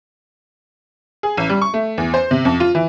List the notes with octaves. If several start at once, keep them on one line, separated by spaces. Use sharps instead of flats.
G#4
A1
G3
C#6
A3
E2
C5
C3
F2
F4
E3